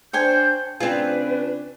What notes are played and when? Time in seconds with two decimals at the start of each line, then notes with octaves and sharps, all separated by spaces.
0.13 D4 C5 C#5 G5 G#5 G6
0.80 C#3 C4 D4 F4 G#4 B4